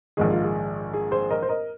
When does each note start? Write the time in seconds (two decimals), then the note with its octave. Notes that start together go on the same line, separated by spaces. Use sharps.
0.17 A#1 G#2 D#3 G#4
0.31 F4
0.44 G#4
0.94 G#4
1.11 G#4 C5
1.30 A#4 D#5
1.42 C5
1.49 A#4 D#5